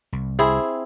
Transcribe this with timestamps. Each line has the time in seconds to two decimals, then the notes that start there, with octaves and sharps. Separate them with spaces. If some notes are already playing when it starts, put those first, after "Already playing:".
0.13 C2
0.39 C4 E4 G#4